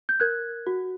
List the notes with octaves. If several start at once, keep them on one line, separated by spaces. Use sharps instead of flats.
G6
A#4 F#6 G#6
F#4